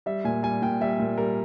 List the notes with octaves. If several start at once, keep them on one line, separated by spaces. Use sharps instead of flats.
G3 E5
A#2 G#5
G3 G#5
A#2 G5
G3 E5
A#2
G3 A#4